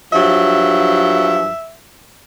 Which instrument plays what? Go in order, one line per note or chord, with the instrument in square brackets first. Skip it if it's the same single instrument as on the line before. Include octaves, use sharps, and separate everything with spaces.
[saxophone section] G2 F3 F#3 [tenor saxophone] E5